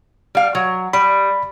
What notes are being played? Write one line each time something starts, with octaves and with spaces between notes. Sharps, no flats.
G3 F5
F#3
G3 B5